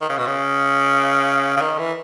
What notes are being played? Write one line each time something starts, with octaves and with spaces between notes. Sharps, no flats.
D#3
C#3
B2
C#3
C#3
D#3
E3